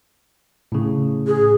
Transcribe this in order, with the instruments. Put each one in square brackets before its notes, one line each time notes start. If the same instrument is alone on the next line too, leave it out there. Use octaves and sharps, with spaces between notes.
[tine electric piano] A2 C#3
[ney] G#4